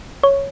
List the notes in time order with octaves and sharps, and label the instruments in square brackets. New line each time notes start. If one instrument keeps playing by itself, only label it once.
[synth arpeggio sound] C#5